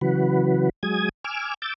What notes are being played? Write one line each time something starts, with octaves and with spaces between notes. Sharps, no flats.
C#3 E3 F#3 F#4 B4
F#3 G#3 G#5 D#6 G#6
G#5 D6 E6 F6
D6 E6 G6 A6